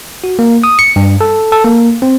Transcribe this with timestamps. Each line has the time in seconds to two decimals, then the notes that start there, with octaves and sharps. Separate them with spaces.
0.24 F#4
0.39 A#3
0.64 D#6
0.79 C#7
0.96 G2
1.21 A4
1.52 A4
1.65 A#3
2.02 C4